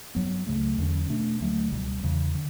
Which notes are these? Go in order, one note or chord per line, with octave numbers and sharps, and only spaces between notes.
G2 F#3 B3
C#2 C#3 F#3 A3
E2 D3 F#3 C#4
B2 A3 D4
D2 D3 F#3 A3
C#2 B2 G3
E2 C#3 E3
D3